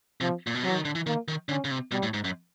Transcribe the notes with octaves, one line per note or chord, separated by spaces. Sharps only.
C3 F3
A#2
B2
C3 F#3
E3
D#3
D3
E3
D#3 A#3
D#3
D3 C#4
C#3
C3
B2 G3
A2
G#2
F#2